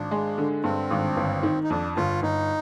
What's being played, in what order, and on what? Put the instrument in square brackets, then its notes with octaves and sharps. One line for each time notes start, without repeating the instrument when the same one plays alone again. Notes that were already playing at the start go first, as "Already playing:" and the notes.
Already playing: [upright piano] G#1 [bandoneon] D4
[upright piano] G#3
D3
[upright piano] G2 [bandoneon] C4
[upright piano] G#1
G1
D#3
[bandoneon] D#4
[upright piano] F2 [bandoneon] D4
[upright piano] G1 [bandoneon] F4
[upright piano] G1 [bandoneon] D#4